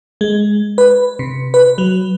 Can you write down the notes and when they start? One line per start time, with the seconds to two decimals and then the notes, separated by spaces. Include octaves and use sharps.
0.21 G#3
0.78 B4
1.19 C3
1.54 B4
1.78 F#3